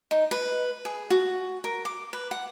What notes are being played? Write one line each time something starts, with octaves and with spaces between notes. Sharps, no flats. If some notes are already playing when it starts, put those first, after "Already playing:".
D#4
B4
G#4
F#4
A#4
D6
B4
F#5